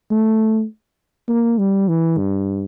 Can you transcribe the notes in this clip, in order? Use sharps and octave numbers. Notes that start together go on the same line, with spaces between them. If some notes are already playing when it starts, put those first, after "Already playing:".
A3
A#3
G3
E3
G2